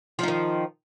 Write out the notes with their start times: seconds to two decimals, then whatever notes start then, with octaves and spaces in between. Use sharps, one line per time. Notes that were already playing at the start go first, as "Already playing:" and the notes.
0.19 F3
0.23 D#4
0.28 D#3